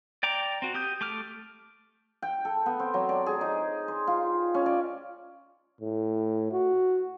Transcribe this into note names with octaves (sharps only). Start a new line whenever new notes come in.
D5 G5 A#5 D6
C4 F#4
G4 D#6 G6
A3 D6 F6
G5
A4
B3
C4
F#3
D5
G#4
D#4
C5
F4
C#4
D5
A2
F#4